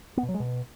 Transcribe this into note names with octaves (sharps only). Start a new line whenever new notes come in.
B3
B2
F#3
G#3
B2